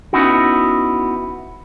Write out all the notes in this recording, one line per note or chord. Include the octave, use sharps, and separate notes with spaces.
B3 C#4 D#4 E4 F#4